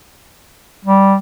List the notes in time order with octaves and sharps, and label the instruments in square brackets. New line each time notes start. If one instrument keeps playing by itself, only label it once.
[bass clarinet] G3